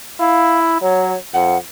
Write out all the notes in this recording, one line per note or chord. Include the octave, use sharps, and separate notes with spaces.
E4 F5
F#3 C#5
F2 F#5